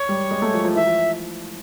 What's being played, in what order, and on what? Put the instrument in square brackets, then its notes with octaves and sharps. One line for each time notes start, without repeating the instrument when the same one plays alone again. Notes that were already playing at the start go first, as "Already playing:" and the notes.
Already playing: [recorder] C#5
[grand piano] G3
G#3
A3
F3
F3
[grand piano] E3 [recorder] E5
[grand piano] F3